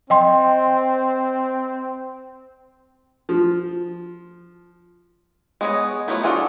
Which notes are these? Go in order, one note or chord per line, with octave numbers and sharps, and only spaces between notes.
C4 D#5 G5 C6
F3
G#3 B3 G#4 C#5 D#5
F3 F#3 A3 B3 E4
D4 F4 F#4 G#4 A4